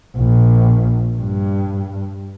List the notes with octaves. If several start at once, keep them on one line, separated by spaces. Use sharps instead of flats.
A#1
G2